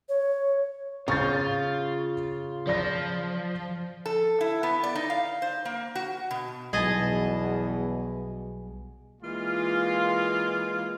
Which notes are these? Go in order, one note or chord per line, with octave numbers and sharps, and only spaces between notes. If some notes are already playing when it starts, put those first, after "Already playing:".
C#5
C#3 F4 C#6 G6 A6
F3 D5 A#6
A4
E4
B3
D5
D#4
F5
C5
A#3
F#4
B2
B1 E2 B2 G3 G#4 D#5 G#5 A5
E3 G#3 A#3 F4